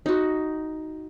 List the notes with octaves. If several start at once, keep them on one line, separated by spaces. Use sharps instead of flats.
D#4 F#4